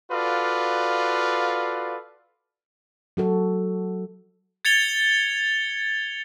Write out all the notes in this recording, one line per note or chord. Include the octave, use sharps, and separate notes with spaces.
F4 F#4 A4 B4 D5 F5
F#3 F#4 A4
G#6 A6 C#7 F7 G7